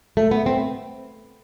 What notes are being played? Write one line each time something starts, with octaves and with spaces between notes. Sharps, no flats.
A3
B3
C4